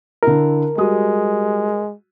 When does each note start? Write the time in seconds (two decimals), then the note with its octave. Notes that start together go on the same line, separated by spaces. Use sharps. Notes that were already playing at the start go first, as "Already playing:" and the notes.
0.23 D3 E4 A#4
0.78 G3 G#3 F#4 D#6